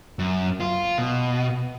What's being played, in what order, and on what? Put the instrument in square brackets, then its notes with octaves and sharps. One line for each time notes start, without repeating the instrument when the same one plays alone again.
[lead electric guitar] F#2
F4
B2